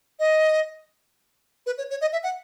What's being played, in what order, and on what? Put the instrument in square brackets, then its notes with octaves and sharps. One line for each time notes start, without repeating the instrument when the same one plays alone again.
[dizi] D#5
B4
C#5
C#5
D#5
E5
F#5